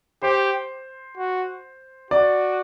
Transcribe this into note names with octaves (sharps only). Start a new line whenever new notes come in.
G4 C5
F#4
F#4 D5